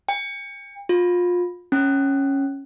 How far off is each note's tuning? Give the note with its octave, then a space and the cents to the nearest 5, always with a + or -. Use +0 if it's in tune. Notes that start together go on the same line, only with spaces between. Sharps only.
G5 +40
F4 +25
C#4 -10